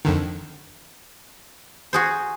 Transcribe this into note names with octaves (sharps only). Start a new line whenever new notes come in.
F2 D3 D#3
F#4 G#4 C5